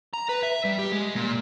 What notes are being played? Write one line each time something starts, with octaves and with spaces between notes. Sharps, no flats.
A#5
B4
E5
G3
G4
G#3
A#2